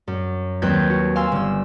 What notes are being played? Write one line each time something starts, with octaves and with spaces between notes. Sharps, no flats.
F#2
D#2 F#3 C4 B4 G6 G#6
F#4
F5 G#5 C6 E6
G1 E6